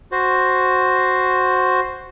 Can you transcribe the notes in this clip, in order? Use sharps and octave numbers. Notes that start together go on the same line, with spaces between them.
F#4 C5